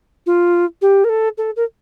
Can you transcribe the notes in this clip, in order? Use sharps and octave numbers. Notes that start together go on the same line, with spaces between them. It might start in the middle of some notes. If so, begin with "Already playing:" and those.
F4
G4
A#4
A4
A4
A#4